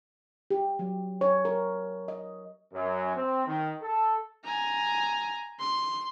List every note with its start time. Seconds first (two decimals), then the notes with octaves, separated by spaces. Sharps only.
0.51 G4
0.79 F#3
1.21 C#5
1.45 A#4
2.08 D#5
2.73 F#2
3.15 C4
3.47 D#3
3.81 A4
4.45 G#5 A#5
5.60 C6